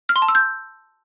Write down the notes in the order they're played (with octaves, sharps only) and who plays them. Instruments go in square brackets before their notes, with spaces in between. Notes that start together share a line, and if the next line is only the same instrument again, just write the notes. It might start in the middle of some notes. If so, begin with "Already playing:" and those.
[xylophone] F6
C6
A5
E6
G6